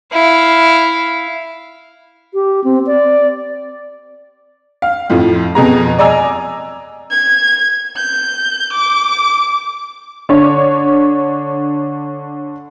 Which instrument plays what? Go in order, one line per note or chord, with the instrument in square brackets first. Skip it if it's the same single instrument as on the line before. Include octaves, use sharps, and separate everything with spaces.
[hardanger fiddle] E4 F5
[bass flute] G4
C4
D5
[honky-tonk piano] F5
F2 A2 F3
F2 B2 G#4 A#5
D5 D#5 G#5 A#5 E6
[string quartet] G#6
G6
D6
[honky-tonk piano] D3 D4 C#5